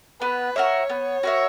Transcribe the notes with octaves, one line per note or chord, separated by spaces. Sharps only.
B3 B4
F#4 A#4 C#5 E5
B3
F#4 A#4 E5